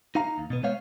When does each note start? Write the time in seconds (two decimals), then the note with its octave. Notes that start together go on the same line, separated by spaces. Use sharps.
0.15 D#4 F5 A#5
0.38 D#2
0.50 B2 B3
0.63 G#3 B3 C5 C#5 F5